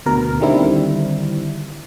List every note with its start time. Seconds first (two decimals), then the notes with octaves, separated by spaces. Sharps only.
0.06 D2 B2 A#4
0.41 D3 D#3 G3 C4 E4